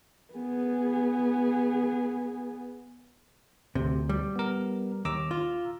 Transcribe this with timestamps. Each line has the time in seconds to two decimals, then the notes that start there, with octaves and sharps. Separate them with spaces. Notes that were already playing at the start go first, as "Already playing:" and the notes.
0.34 B3 G#4
3.75 D2 C3
4.09 G3
4.36 B3 A#4
5.05 D#2 A#5 D6 E6
5.31 F4